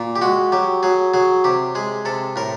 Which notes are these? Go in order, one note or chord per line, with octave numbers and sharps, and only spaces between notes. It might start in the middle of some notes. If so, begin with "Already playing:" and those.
Already playing: A#2
G4
G#3 F#4
F#3 G4
F#3 G#4
F#3 G#4
C3 G4
G#3 G#4
C3 A4
A2 A#4